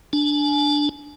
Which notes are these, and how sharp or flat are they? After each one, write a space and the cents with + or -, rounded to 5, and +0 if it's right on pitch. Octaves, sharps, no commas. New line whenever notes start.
D4 +0 G#5 +30